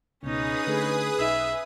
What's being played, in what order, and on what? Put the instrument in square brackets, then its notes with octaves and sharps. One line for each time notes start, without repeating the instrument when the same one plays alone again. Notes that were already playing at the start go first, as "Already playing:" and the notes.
[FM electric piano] C#2 B2 [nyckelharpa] C#4 D#4 [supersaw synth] G#4 B4 D#6
[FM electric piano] D3 A3
[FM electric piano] B1 D#4 [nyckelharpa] E5